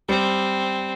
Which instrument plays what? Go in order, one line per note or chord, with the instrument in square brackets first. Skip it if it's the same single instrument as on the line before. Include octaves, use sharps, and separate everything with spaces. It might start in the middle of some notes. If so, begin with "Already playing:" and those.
[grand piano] G3 [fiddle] C4